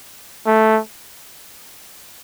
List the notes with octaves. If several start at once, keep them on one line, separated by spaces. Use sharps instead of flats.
A3